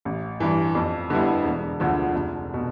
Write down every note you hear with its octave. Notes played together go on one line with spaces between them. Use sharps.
A1
G2 E3
F2
D3 G3 B3 E4
E1
D2 D3 F3
F1
B2